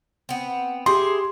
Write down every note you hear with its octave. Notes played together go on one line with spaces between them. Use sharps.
B3 C4
E4 G4 G#4 C6